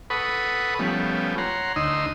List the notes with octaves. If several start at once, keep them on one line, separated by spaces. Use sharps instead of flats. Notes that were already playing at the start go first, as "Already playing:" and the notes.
A4 B4 F#5 B5 C#6 D#6
F3 G3 A3 B3 C#4
C#5 F#5 A#5 C6
D2 D#4 D#5 C6 E6